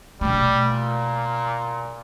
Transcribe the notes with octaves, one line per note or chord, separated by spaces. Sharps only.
B2 G3 A3
A#2